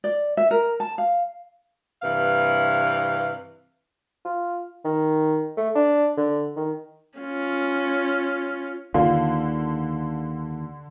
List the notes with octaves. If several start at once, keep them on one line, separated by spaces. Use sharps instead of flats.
D5
E5
A#4
A5
F5
G2 C3 E3 B4 F5
F4
D#3
A3
D4
D3
D#3
C#4 F4
D#2 D3 F4